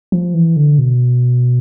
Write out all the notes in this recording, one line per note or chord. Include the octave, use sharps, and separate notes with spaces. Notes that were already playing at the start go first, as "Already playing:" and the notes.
F3
E3
D3
B2